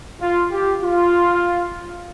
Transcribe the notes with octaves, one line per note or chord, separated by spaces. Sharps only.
F4
G4
F4